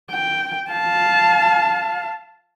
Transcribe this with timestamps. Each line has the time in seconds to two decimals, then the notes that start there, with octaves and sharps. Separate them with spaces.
0.11 G5
0.70 F5 A5